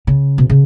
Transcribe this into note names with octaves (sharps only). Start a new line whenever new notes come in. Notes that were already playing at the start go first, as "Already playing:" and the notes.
C#3
B2
C#3